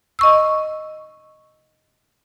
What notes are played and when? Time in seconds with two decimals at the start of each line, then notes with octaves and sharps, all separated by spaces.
0.19 D#5 C#6 E6